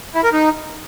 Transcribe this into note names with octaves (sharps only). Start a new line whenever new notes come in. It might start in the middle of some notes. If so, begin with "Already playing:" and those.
E4
A#4
D#4